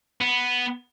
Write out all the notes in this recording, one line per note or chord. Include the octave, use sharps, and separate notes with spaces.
B3